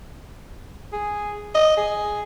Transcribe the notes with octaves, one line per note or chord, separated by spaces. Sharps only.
G#4
D#5
G#4